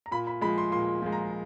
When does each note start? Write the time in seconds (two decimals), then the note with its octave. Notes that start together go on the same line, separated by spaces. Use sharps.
0.06 A#5
0.11 A#2 B5
0.27 B5
0.41 F3 G#3 B5
0.58 C6
0.72 A#2 C6
1.02 F3 G#3
1.12 A#5